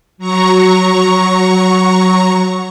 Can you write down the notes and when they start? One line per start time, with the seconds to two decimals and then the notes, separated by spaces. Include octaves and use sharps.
0.18 F#3 A#5 C#6